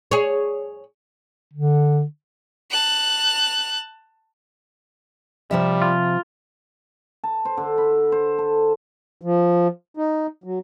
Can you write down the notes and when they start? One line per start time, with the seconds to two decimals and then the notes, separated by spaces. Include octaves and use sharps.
0.11 G#4 C#5
1.53 D3
2.71 A5 F#6
5.51 C3 F3 G3 E5
5.82 F4
7.24 A5
7.45 C5
7.57 D3
7.78 B5
8.12 C5
8.38 A4
9.21 F3
9.97 D#4
10.44 F#3